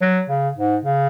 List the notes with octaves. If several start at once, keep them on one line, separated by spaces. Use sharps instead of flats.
F#3
C#3
G#2
C#3